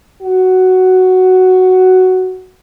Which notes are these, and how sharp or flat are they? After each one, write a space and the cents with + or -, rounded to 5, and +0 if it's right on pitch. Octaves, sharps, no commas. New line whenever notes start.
F#4 +5